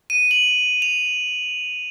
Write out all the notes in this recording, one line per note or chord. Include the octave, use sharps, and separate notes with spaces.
D#7
F#7
F7